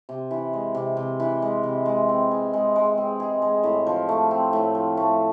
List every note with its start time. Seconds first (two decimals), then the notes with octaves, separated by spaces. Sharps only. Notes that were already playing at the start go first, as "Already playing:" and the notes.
0.09 C3
0.31 E3
0.53 G#3
0.74 C3
0.97 C3
1.20 E3
1.42 G#3
1.63 C3
1.86 G#3
2.09 C4
2.31 G#4
2.53 G#3
2.76 G#3
2.98 C4
3.20 G#4
3.42 G#3
3.63 A2
3.86 F3
4.09 A3
4.31 C4
4.53 A2
4.75 F3
4.97 A3